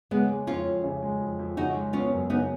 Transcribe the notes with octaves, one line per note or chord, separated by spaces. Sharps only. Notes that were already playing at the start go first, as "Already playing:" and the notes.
C#3 G#3 B3
G#3
F2 C#4 F4
F2
C#3
G#3
F2
F2
C#3 D#4 F#4
G#3
B3 C#4 F4
F#2
C#3 B3 D#4